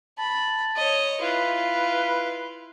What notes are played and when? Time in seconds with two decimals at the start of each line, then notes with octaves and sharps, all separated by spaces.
0.19 A5 B5
0.76 C#5 D#5
1.21 E4 F4 B4